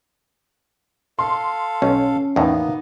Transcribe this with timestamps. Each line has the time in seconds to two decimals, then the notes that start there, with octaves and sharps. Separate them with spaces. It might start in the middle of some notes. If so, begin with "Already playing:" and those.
1.19 A4 F5 C6
1.82 B1 C#4
2.36 E2 A2 A#3 B3 D#4